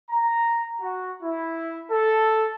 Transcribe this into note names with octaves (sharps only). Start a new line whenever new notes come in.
A#5
F#4
E4
A4